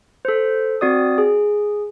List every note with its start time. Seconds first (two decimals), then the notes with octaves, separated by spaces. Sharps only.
0.25 A4 C5
0.81 C4 F#4 D5 D#6
1.18 G#4